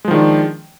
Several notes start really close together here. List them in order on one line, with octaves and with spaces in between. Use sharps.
G#3 F3 D#3 D4